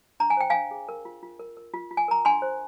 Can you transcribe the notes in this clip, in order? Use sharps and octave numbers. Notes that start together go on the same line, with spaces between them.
D4 A#5
G#5
C5 G5
D4 F5 G#5
G#4
A#4
F4
F4
A#4
A#4
F4
F4
G#5
A#4 A#5
D4 G#5 C6
C5